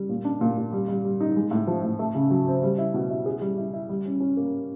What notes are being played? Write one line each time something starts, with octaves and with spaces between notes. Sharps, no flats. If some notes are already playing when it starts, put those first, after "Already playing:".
Already playing: G3
A#2
D4
A#2
A#2
G3
G3
G3
D#4
G#3
A2
F3
A2
A3
C#3
F#3
C4
G3
E4
B2
E4
G#4
G3
E4
E4
G3
C#4
C#4
A#3